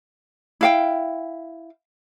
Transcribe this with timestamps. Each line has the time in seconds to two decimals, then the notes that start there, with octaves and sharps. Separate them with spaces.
0.61 E4 F5 G5